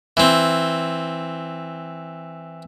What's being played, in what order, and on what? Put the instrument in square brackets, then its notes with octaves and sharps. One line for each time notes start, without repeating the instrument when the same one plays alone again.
[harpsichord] E3 C4